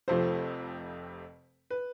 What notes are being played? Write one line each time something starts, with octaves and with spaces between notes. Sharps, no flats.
F1 F2 C3 F3 A3 C5
B4